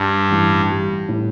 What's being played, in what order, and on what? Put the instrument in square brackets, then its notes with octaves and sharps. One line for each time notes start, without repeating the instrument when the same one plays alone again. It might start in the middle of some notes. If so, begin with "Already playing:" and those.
Already playing: [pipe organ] G2 [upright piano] D4
[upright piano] A1
G3
A2